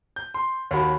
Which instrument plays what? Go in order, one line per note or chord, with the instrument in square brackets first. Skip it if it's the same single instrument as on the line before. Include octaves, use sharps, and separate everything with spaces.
[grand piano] G6
C6
[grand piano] D#2 F#4 [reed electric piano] C#5 B5